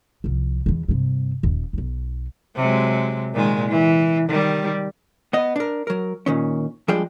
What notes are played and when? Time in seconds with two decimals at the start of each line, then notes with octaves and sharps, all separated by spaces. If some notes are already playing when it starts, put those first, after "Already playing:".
0.24 C2 F3
0.66 E2 E3
0.89 G2 C3
1.43 D#1 D#2
1.73 B1 D#4
2.55 C3 F#3 G#3
3.34 A#2 D#3 G#3
3.68 E3
4.29 D#3 G3
5.33 B3 D#5
5.56 D4 A#4
5.87 F#3 A#4
6.26 A#2 D#3 C#4
6.88 F3 G3 G#3 D4 G#4 G5